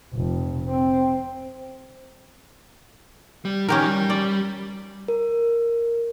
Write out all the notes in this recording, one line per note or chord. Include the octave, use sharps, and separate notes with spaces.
F1
C4
G3
D#3 E3 C#4 G4 A#4
G3
D5
A#4